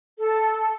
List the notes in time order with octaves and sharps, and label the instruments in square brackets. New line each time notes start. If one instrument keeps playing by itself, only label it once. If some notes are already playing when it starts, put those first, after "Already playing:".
[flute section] A4